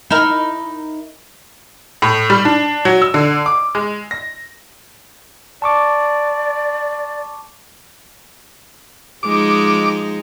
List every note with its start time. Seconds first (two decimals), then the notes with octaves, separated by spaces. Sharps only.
0.11 D#4 E4 A#4
2.02 A2
2.30 G3
2.45 D4
2.85 F#3
3.02 E6
3.14 D3
3.46 D6
3.75 G#3
4.11 A#6
5.62 D5 A5 C#6 D6
9.23 F3 G#3 D#4 D6